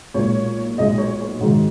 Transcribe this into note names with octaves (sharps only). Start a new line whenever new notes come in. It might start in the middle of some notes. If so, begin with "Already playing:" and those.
B1 A#2 G#3 C#5
B1 A#2 G#3 D#5
C#5
C#5
A#1 G#2 D#3 F#3